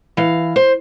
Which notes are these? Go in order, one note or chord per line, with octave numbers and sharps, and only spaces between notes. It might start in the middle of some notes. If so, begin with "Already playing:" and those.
E3 F5
C5